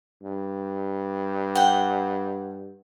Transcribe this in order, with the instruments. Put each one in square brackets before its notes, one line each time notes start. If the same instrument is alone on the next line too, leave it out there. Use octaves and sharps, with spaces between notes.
[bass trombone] G2
[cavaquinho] F#5 G5